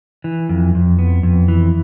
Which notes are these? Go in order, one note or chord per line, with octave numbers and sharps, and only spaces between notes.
E3
F2
F2
B3
F2
E3